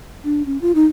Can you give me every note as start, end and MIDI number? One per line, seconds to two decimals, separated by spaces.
0.24 0.42 62
0.46 0.58 61
0.61 0.72 65
0.75 0.85 63